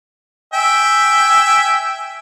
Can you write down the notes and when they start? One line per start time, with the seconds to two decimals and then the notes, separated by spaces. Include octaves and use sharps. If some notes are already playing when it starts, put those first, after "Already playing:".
0.53 E5 G5 G#5